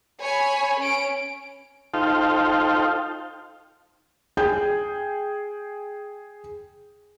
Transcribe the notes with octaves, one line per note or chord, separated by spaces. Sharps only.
C#5 G#5 B5
C#4 D7
D#4 F4 A4 C5 F5 G5
G#4 G5 G6